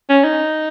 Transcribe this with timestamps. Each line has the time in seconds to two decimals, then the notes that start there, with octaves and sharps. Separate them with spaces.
0.09 C#4
0.24 D#4